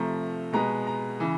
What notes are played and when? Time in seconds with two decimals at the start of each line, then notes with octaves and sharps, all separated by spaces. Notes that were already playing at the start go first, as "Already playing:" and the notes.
Already playing: C3 F3 A3 A#5
0.53 B2 G#3 B3 A#5
0.87 A#5
1.20 C#3 E3